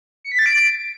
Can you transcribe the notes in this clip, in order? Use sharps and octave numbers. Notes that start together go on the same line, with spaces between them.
C#7
B6
A6
D7